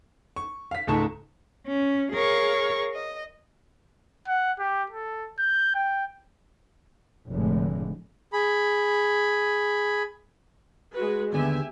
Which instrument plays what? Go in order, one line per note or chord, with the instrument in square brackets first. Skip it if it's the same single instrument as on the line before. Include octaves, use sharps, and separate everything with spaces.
[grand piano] C#6
F5 B6
C#2 G#2 A3 A5 C#6
[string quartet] C#4
G#4 A#4 C#5 F5 C#6
D#5
[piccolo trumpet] F#5
G4
A4
G6
G5
[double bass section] F1 A2 D3 G#3
[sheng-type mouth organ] G#4 B5
[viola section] G#3 F#4 B4
[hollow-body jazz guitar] D#2 D3 B3 [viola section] G4 E5 G#5